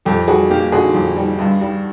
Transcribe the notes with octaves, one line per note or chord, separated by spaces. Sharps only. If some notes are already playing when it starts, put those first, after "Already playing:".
F2 G4 A4
G3 F#4 G#4
A#3 G4
D3 F#4 G#4
F2
G3
G2
G3